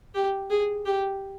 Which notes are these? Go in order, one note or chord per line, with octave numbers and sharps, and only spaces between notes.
G4
G#4
G4